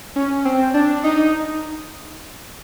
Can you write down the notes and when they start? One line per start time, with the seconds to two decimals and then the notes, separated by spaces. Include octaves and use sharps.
0.16 C#4
0.45 C4
0.74 D4
1.04 D#4